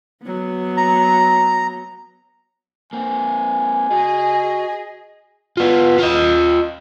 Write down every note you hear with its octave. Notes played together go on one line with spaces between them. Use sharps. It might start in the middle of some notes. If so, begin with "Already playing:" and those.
F#3 B3
A#5
A#3 C4 G#5
F#4 G#4 D#5 A5
B3 F4
F4 D#5